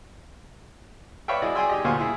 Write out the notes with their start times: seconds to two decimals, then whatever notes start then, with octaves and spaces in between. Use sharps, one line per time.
1.28 B4 C#5 D5 E5 F5 G5
1.42 E4 F#4 G#4 D5 D#5
1.55 G#4 D5 G5 G#5 C6 E6
1.70 D#4 G4 D#5
1.84 D2 A#2 C5 F5 G#5 C#6
2.00 E4 G#4